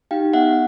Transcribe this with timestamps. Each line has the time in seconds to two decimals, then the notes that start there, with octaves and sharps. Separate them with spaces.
0.11 D#4 G4 F5 G5
0.34 B3 E5 F#5